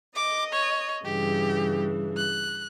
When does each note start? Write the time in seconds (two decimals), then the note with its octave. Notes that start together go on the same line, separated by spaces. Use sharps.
0.16 D#5 D6
0.53 C#5
1.05 G2 C#3 E3 G4
2.17 F#6